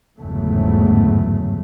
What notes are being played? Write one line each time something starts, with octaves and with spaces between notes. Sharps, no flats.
G1 E2 G#2 C#3 F#3 A3